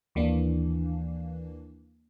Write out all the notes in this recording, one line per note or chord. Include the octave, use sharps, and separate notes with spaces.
D#2 E3 A#3 D4